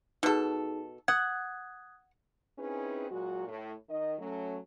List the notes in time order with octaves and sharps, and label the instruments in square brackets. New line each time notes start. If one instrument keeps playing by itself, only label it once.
[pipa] B2 A4 [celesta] D#4 G#4
[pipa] F#5 [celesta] D#6 F#6 G#6
[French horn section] C4 C#4 D#4 E4 G#4 B4
A#2 F#3 G#3 F#4
A2
D#3 D#5
F#3 A3 C#4